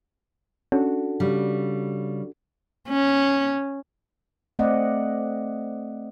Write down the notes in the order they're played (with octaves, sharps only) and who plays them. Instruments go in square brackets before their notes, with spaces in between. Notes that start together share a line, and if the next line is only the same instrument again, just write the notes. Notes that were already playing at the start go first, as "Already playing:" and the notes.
[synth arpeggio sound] C#4 [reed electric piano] D4 F#4 A4
[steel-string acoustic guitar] C#3 G3
[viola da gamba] C#4
[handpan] A3 C4 D5 D#5 F#5